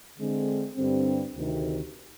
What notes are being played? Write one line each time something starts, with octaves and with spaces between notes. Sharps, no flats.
D3 G#3 C4
G2 D3 G3 C4
D2 C3 D#3